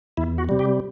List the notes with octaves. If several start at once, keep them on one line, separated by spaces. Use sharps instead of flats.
E2 E4
F#4
C3 G3
G4